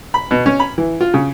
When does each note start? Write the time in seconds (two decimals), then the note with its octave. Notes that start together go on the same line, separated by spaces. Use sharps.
0.14 B5
0.31 B2
0.46 C#4
0.60 B5
0.78 E3
1.01 F4
1.14 C#3